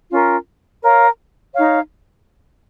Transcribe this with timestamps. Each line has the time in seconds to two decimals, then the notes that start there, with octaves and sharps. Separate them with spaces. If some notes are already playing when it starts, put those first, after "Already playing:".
0.10 C#4 F4 A#4
0.82 A#4 C#5 F5
1.54 D#4 C#5 F5